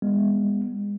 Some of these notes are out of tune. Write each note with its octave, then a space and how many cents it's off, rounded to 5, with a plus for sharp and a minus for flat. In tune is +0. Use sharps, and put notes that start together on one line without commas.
G#3 -35 B3 -5